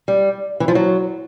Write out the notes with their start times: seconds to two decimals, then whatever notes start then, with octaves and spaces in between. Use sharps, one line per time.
0.08 G3
0.60 E3
0.68 F3
0.75 F#3